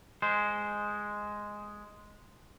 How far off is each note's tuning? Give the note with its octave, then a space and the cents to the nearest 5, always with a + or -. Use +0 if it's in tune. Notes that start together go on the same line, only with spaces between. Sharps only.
G#3 +0 C5 -10